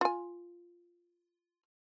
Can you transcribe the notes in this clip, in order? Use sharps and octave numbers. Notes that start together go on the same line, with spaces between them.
F4 G#5